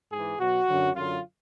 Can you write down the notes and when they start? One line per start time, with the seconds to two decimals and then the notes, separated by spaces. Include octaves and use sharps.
0.11 G#2 E3 G#4
0.40 B2 F#3 F#4
0.67 F#2 D3 F#3
0.95 F#2 D3 F#3 F4